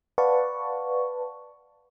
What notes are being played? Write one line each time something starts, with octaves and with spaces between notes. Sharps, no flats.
B4 D5 F5 F#5 A5 C#6